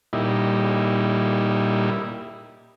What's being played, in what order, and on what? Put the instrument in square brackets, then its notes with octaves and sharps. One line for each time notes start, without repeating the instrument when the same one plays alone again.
[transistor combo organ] A#2 G3 D#4 E4